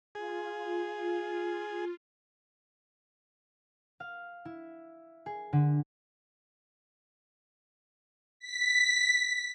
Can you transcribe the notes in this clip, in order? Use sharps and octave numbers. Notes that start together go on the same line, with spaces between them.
F4 G#4
F5
E4
G#4
D3
B6